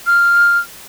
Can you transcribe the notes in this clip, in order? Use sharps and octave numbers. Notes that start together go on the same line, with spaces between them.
F6